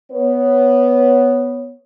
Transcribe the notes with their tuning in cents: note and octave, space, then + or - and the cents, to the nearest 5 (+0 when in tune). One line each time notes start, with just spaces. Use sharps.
B3 +0 C#5 +0